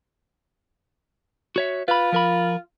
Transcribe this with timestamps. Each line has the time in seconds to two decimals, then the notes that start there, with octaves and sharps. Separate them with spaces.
1.56 F#4 C#5 E5
1.88 F4 B4 B5
2.12 F3 A#4 B5